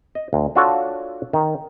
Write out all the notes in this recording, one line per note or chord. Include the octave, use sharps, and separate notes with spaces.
D#5
D2
D4 F4 F#4 A4 C#5
D#3